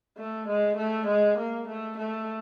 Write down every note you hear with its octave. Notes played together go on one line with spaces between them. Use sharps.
A3
G#3
A3
G#3
A#3
A3
A3